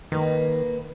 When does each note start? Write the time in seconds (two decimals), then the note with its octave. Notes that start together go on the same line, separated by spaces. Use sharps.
0.12 D#3 A#3 B4